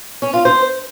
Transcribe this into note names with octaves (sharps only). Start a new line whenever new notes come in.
C#4
F4
C5